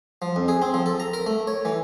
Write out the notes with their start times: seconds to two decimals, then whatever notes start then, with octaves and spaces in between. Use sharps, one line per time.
0.22 F3
0.36 F2
0.48 G#4
0.62 C4
0.74 F3
0.86 A4
1.00 A#5
1.13 A#4
1.26 A3
1.47 C#5
1.65 E3